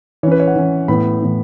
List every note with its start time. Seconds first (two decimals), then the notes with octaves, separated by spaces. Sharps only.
0.23 E3 C#5
0.27 C#4 B4
0.40 C#5
0.47 F#5
0.56 E3 C#4
0.88 A2 E3 B3 B5
1.21 A2 E3 B3